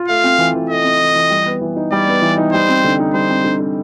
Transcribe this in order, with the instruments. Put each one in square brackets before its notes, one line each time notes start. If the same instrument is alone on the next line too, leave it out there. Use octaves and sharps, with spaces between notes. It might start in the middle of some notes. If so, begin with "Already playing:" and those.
Already playing: [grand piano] F4
[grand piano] A3 [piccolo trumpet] F5
[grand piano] C4
E3
E3
[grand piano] A3 [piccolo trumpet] D#5
[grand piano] C4
E3
E3
G3
B3
E3
D#4
[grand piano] G3 [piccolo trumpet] D5
[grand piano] B3
E3
D#4
[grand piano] G3 [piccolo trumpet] C5
[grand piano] C4
D3
D#4
[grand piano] G3 [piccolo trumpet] C5
[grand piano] C4
D3
D#4